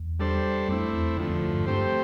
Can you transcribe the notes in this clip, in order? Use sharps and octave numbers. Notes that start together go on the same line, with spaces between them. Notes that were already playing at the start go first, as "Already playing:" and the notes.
Already playing: E2
G3 D4 A4 C5
F2 A3 C4 E4
E2
E2 D3 F3 A3
F2
F2
G2
G2 A3 C4 G4 C5